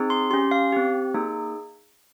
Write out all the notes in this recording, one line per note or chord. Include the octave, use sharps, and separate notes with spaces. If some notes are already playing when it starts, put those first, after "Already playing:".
Already playing: C4 D#4 G#4
C6
C#4 G4 C6
F5
C4 G4
A#3 D#4 G#4